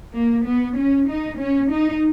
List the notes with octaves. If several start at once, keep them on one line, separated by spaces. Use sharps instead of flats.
A#3
B3
C#4
D#4
C#4
D#4